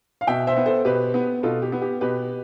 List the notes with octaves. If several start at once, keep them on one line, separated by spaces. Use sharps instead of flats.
F5
B2 E5 G5
C5 E5
B3
A4 C5
B2 G4 B4
B3
B2 F4 A4
G4
B3
G4
B2 G4 B4